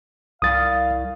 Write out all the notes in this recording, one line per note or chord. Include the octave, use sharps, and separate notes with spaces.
C2 F5 D#6 A6